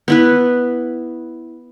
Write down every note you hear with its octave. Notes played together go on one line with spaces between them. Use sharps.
B3 E4 B4